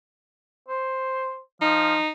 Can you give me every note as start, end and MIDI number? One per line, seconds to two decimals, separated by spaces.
0.68 1.39 72
1.61 1.95 53
1.61 2.10 63